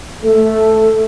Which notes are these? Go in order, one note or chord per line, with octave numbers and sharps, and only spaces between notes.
A3 A4